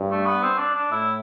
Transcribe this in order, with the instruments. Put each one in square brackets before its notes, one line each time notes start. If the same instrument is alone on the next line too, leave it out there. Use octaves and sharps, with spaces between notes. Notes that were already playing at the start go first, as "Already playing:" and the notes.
Already playing: [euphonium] G2
[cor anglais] A3
B3
C4
D4
D4
[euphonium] A2 [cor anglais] E4